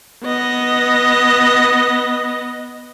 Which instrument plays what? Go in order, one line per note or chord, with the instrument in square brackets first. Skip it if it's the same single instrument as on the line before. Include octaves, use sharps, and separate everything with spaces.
[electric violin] B3 D#5